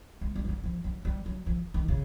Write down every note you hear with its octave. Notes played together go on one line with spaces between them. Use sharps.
G#3
G3
F#3
G3
F3
F#3
G3
F#3
F3
D#3
C#3